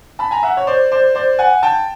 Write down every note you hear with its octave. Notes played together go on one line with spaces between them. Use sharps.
A5 B5
G#5 A#5
E5 F#5
C#5
C5 D5
C5 D5
C5 D5
F#5 G#5
G5 A5